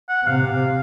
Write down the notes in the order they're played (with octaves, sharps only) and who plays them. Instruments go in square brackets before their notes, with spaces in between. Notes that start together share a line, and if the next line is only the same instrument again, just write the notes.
[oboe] F#5
[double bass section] C3 [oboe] F5